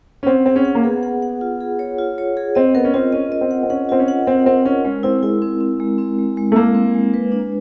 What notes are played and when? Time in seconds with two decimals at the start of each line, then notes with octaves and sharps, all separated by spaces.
0.23 C#4
0.27 C4 F#5
0.46 C4 G#4
0.56 C#4
0.65 F#5
0.75 A#3
0.84 B3 G#4
1.03 F#5
1.22 F#5
1.41 F4
1.61 G#4
1.79 C#5
1.98 F4
2.18 C#5
2.37 G#4
2.55 C4 D#5
2.74 B3 A#4
2.84 C#4
2.94 C4 F4
3.13 C#4 D#5
3.30 C#4 D#5
3.41 C4
3.51 F#5
3.63 C4
3.70 C#4 F#5
3.89 C4 F4
3.99 C#4
4.08 F#5
4.27 C4 A#4
4.46 C4 A#4
4.65 C#4 A#4
4.85 G#3 C#4
5.03 C4 E4
5.23 G#3 E4
5.42 C4
5.61 C4
5.80 G#3
5.98 C4
6.18 G#3
6.37 G#3
6.52 A3
6.56 G#3 A#3
6.75 C4
6.95 G#3
7.14 B4
7.32 D4